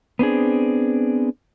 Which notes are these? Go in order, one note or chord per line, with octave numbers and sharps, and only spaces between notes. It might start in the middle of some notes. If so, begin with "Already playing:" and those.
B3 C4 D4 G#4